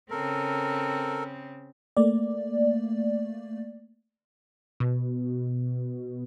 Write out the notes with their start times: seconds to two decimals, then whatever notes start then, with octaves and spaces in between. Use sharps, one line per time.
0.11 C#3 C4 A4 A#4
1.97 A3 A#3 D5
4.80 B2